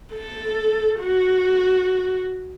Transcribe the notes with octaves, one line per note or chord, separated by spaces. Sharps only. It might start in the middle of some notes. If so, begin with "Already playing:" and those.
A4
F#4